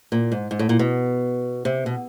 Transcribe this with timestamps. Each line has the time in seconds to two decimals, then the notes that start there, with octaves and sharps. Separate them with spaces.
0.12 A#2
0.32 G#2
0.51 G#2
0.59 A2
0.69 A#2
0.79 B2
1.65 C3
1.86 B2